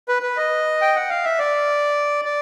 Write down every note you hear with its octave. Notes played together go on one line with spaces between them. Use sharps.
B4
B4
D#5
G5
F#5
F5
E5
D5
D5